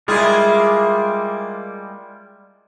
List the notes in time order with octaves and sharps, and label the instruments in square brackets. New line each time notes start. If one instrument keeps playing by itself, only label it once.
[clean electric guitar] G3 G#3 F4 [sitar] A#3 E4 G#4